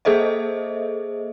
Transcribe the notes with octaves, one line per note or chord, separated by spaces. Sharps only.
A#3 G#4 A4 C5 D#5 E5